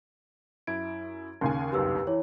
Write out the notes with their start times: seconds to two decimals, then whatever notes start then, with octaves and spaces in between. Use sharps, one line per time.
0.67 F#2 E4 G#6 D7
1.41 D#2 C#3 G#5 C6
1.72 G1 C2 F#2 G4 B4 E6
2.07 E3 E4 C#5